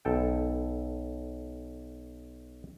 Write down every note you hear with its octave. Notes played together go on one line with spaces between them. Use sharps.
B1 A4 G5